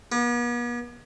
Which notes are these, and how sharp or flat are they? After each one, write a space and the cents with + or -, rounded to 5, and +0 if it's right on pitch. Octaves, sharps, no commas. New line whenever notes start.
B3 -45